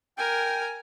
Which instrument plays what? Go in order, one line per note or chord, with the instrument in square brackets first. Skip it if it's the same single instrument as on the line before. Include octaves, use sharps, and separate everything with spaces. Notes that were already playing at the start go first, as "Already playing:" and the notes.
[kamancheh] A#4 G#5 [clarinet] G5